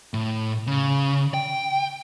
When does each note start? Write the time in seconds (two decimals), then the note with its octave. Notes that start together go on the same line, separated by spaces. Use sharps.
0.14 A2
0.67 C#3
1.34 G5